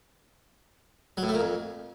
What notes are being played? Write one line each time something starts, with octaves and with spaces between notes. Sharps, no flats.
F#3
A2
A3
A#2
F2